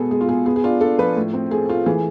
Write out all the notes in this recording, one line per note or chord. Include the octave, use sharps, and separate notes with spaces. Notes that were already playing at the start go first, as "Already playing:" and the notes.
Already playing: B2 G#3 B3 G#4 A4
G#3 G#4
F4
B2 G#4
B3 G#4
G#4
D4 F4
D4 A4
F3 B4
A2
C4
A3 G#4
A3 F4
E3 G#4